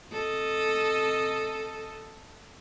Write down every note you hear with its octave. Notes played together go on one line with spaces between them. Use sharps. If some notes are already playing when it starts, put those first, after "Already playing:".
C3 A4 D#5